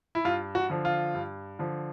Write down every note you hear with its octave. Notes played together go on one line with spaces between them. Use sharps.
E4
G2 F4
F#4
D3 F3
F4
G2
D3 F3